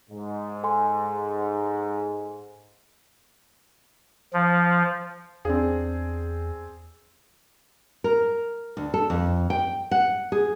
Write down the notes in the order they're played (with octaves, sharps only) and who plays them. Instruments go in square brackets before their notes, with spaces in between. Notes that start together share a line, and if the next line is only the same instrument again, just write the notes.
[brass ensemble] G#2
[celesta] A4 G#5 C6
[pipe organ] F3
[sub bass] E2 [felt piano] C4 D4 G#4
[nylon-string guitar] A#4
D2
A4
F2
G5
F#5
G#4